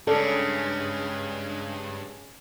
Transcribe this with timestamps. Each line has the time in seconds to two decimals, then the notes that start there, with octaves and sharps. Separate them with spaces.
0.07 G2 C#3 G#3 A4 D5